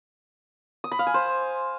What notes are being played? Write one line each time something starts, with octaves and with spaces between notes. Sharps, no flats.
D#6
B5
F5
G#5
C5